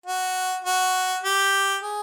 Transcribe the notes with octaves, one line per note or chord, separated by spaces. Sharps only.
F#4
F#4
G4
G#4